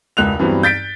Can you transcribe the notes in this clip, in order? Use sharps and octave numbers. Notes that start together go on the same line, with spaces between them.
E1 C#2 F#6 F7
G2 E3 F#3 B3 C4
G6 A6 B6 D7